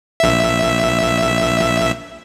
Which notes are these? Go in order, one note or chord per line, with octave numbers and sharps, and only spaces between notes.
A#1 E5